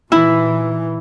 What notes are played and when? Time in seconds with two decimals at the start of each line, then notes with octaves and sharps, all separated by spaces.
0.12 A#2 E3 E4